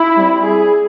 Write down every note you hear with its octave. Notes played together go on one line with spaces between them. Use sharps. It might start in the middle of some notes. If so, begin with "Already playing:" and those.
Already playing: E4
G3 C4
G#4